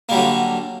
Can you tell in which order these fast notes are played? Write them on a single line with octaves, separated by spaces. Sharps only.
A#3 G3 F#3 D3